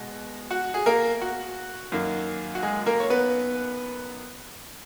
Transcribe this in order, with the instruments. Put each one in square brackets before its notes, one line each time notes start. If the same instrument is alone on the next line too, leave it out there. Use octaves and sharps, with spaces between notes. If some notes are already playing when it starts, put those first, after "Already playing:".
Already playing: [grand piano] B2 G#3
F#4 F#5
G#4
A#3 A#4
F#4
F#2 D#3 A#3
F#4
G#3 G#4
A#3 A#4
C#5
B3 B4